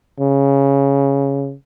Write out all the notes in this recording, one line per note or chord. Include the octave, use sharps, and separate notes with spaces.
C#3